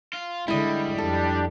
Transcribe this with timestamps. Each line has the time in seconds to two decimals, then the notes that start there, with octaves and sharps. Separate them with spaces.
0.13 F4
0.48 D3 G3 G#3 E4 D#5
0.98 F2 D4 G4 A4